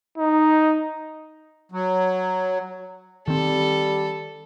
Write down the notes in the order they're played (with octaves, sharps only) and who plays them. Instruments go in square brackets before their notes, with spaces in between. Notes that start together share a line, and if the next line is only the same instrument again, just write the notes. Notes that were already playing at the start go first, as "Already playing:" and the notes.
[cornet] D#4
[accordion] F#3
[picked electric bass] D#3 C4 [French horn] G3 [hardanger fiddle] A4